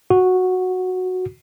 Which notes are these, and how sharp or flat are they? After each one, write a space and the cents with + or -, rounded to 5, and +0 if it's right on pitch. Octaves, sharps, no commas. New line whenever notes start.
F#4 -5